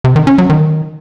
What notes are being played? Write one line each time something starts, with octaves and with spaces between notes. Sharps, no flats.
C3
D#3
C#4
F#3
D#3